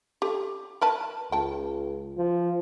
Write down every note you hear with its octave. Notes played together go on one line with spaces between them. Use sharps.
G4 A4
A#4 B4 A5
C#2 G5 A5
F3